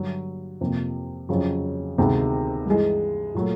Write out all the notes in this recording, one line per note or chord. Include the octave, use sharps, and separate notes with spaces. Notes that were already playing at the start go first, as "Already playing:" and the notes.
Already playing: G2 D3 F#3
F2 C3 F3 A#3
F2 C#3 F#3
D2 C3 D#3 G#3 B3
G2 E3 G#3
A#2 F#3 A3